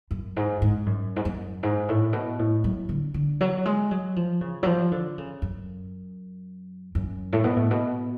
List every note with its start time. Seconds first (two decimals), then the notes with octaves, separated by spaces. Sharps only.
0.11 F#2
0.36 G#2
0.62 G#2
0.86 F#2
1.16 G#2
1.25 F#2
1.63 G#2
1.89 A2
2.13 B2
2.39 A2
2.64 F#3
2.89 D3
3.14 D3
3.41 F#3
3.65 G#3
3.91 F#3
4.16 F3
4.41 C#3
4.63 F#3
4.66 F3
4.92 D3
5.18 C#3
5.42 F#2
6.95 F#2
7.33 A2
7.44 B2
7.57 A2
7.71 B2